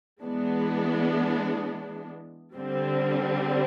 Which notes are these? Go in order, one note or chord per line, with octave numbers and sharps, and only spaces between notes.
E3 G#3 B3 D4
D3 G3 C4